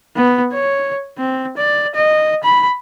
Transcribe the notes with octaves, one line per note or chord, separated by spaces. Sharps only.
B3
C#5
C4
D5
D#5
B5